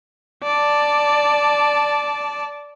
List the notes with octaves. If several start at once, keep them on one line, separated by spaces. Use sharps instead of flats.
D5 A5